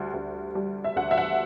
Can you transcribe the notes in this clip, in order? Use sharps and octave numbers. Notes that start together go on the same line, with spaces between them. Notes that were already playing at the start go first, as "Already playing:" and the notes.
Already playing: D2 G3
D2
G3
E5
D2 F#5
E5
F#5